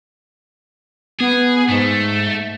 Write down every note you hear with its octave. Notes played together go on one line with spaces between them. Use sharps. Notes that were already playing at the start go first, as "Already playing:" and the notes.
B3 G#4
G#2 A3